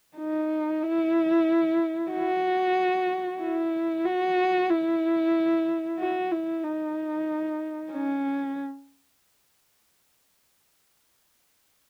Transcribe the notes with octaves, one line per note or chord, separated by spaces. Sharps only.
D#4
E4
F#4
E4
F#4
E4
F#4
E4
D#4
C#4